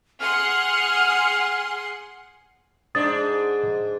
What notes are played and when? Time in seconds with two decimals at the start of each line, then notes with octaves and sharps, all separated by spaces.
0.20 G#4 F#5 C6 F6
2.95 G#2 D4 D#6 A6